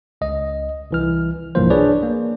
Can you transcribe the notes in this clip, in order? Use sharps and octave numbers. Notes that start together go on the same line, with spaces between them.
C#2 D#5
C2 E3 F6
B1 G2 E3 F3 A#3 C5
D4 G#4 B4 C#5 D5
A#3